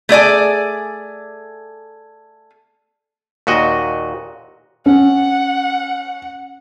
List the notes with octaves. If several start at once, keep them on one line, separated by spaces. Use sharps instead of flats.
A3 G#4 D5 G#5
D#2 A#2 F#4 D#5
C#4 F#5